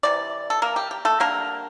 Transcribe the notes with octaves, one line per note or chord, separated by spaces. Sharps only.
C3 E3 D5
A4
A#3 A#4
G4
G4
A3 A4
D3 G3 A#3 D4 A#4